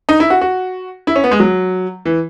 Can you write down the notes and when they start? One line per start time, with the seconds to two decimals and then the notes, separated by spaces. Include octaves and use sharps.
0.09 D#4
0.20 E4
0.30 F#4
0.41 F#4
1.07 E4
1.16 C#4
1.24 B3
1.31 G#3
1.40 F#3
2.05 E3